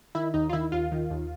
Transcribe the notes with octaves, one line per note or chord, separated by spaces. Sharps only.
D#3 E4
D#2 D#4
F4
D#3 E4
D#2 F4
D#3
D#2